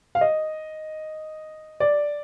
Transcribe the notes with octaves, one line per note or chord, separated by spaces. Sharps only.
F5
D#5
D5